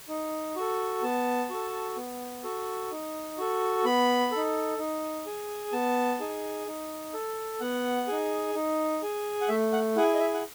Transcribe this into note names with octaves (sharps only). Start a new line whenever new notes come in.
D#4
F#4 A4
B3 A5
F#4 A4
B3
F#4 A4
D#4
F#4 A4
B3 B5
D#4 A4
D#4
G#4
B3 A5
D#4 G#4
D#4
A4
B3 F#5
D#4 G#4
D#4
G#4
F#5
A3 E5
F#5
E4 G#4 F#5
D#5
E5
F#5